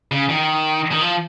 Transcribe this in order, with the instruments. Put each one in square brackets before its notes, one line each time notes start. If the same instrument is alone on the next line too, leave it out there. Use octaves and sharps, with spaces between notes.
[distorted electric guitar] C#3
D#3
D#3
F3